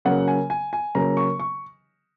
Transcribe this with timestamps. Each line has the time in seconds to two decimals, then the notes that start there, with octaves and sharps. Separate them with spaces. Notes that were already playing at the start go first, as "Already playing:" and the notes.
0.05 C#3 F#3 A#3 F#5
0.28 G#5
0.50 G#5
0.73 G#5
0.95 C#3 F#3 A#3 A#5
1.17 C#6
1.40 C#6